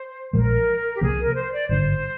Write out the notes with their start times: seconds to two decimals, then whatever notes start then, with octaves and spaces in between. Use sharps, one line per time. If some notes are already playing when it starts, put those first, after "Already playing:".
Already playing: C5
0.33 A#1 A#2 F3 G#3 A#4
0.94 G4
1.01 C2 C3 F3 A#3 G#4
1.18 A#4
1.34 C5
1.51 D5
1.69 G#1 G2 D3 C5